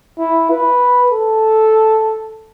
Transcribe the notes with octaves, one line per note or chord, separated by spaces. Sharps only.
E4
B4
A4